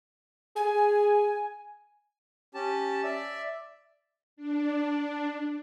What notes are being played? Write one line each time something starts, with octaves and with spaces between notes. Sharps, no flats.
G#4 G#5
C#4 G4 A5
D5 E5
D4